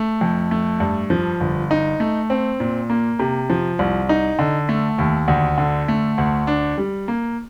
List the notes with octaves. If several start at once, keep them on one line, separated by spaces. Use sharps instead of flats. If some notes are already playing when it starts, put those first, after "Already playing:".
Already playing: A3
F2
A3
G2
F3
G1
D#4
A3
C4
A#2
A#3
C3
F3
C2
D#4
D3
A3
D#2
D2
D3
A3
D2
D4
G3
A#3